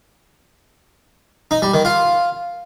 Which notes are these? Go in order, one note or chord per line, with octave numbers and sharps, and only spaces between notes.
D#4
G3
D#3
F4